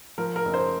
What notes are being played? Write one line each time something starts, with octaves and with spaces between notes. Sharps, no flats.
F3 A#4
A#4
F#1
C5